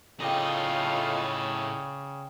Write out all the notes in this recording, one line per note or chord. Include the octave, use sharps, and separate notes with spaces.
A2 C#3 A3 D#4 F4 D5 D#5 G5